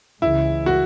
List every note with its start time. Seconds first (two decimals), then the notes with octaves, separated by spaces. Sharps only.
0.22 C#2 C#3 E3 G#3 E4
0.66 F#4